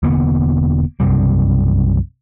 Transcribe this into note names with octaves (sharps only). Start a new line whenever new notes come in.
E1 D3 A#3 B3
B1 F#2 C3 G3